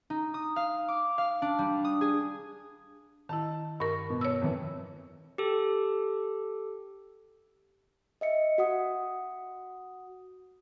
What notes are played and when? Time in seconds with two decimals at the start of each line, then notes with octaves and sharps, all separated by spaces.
0.10 D#4
0.34 D#6
0.56 F5
0.88 D6
1.18 F5
1.42 D4
1.59 G3
1.85 D#6
2.01 G#4
3.29 D#3 E4 A5
3.80 G2 A#4 C#6
4.10 B2
4.21 C#5 E6
4.41 F2 E3
5.38 G4 A4
8.21 D#5 E5 C#7
8.58 F#4 F#5 D#6